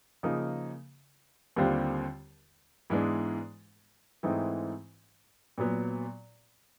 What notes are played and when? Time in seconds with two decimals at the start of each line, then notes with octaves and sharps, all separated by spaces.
0.23 C#3 F3 A#3 D#4
1.56 D#2 D3 G3 C4 F4
2.90 G#2 E3 G#3 B3 D4
4.23 G#2 E3 A3 C4 D#4
5.58 A#2 F#3 B3